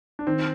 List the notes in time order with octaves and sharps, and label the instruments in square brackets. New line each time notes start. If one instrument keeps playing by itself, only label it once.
[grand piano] D4
[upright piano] D#3 [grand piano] C4